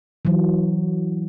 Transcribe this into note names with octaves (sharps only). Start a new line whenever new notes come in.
E3 F#3